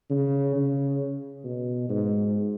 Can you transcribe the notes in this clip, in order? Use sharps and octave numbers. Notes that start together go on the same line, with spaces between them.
C#3
C#3
B2
G#2